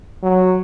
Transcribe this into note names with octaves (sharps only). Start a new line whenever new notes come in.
F#3